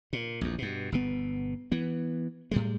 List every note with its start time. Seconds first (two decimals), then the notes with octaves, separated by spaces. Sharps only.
0.13 A#2
0.41 A#1 E2
0.58 G2 B2
0.92 G1 B2 B3
1.72 E3 B3
2.51 A2 G3 G#3